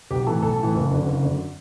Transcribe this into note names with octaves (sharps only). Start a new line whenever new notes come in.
B1 G4
A2 E3 A4
B1 A4
A2 E3
F#1
F#2 D3
F#1
F#2 D3